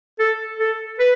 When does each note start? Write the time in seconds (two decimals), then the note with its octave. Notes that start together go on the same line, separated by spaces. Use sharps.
0.19 A4
0.59 A4
0.99 B4